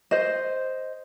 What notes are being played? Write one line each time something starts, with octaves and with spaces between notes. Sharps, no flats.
C5 D#5